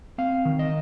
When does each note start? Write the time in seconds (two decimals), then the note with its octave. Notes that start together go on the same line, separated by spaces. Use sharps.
0.18 C4 F5
0.45 D#3
0.59 D#5